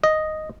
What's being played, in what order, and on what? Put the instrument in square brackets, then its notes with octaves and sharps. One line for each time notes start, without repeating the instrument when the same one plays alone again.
[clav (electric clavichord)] D#5